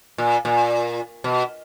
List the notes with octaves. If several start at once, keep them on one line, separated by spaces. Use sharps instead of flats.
A#2
A#2
B2